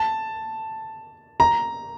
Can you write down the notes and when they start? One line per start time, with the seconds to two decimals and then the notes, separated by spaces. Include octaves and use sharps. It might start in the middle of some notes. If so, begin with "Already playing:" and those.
Already playing: A5
1.40 A#5